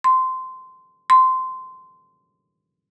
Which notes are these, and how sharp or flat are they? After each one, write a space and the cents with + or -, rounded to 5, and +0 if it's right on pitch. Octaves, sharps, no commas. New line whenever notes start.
C6 -15
C6 -15